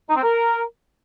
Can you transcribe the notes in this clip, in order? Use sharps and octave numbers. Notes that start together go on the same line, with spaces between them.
D#4
C4
A#4